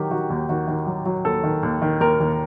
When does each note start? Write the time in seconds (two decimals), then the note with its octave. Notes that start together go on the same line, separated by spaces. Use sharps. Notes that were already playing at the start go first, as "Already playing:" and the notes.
Already playing: D#3 F#3 G4
0.11 D#3 F#4
0.30 D#2
0.49 D#3 F#4
0.68 D#3
0.87 F#3
1.06 F#3
1.25 D#2 A4
1.44 D#3
1.63 D#2
1.82 D#3
2.00 D#2 A#4
2.20 D#2